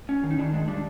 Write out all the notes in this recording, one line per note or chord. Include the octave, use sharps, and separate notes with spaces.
C#4
D#3
D#4
D#3 D4 E4
G#3 D4
G3 D4